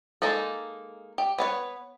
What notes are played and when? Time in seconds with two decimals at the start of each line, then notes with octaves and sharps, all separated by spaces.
0.22 G#3 A#3 D#4 A4
1.18 G4
1.38 B3 B4 C#5